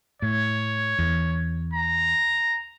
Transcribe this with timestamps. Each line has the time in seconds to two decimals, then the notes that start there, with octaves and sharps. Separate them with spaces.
0.22 A2 C#5
0.99 E2
1.74 A#5